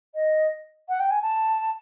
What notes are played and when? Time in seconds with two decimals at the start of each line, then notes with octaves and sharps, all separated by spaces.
0.14 D#5
0.88 F#5
0.99 G5
1.10 G#5
1.22 A5